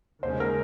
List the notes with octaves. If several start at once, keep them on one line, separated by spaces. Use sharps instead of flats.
D#2 C#3 G#3 C#4 C5
A#4